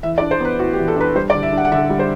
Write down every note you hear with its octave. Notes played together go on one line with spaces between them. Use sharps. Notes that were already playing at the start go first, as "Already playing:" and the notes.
E3 E5
D5
D4
C5
B3 B4
A2 F#4
G4
E3
A4
D4 B4
G3 C5
D5
D3
E5
D4 F#5
F#5
D3 E5
G3
C5